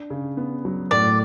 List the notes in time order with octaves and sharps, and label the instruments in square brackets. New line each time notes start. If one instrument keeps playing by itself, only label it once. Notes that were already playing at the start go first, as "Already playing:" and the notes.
Already playing: [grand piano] D4
C#3
B3
F#3
[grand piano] A2 [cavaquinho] D5